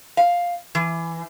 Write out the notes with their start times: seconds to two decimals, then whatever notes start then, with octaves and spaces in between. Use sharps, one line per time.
0.17 F5
0.75 E3